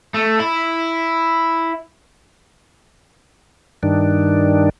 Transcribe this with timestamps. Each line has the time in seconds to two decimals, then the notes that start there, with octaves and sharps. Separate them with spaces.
0.14 A3
0.40 E4
3.83 G2 D#3 D4